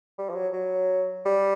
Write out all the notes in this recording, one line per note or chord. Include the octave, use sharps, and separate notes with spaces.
G3
F3
F#3
F#3
G3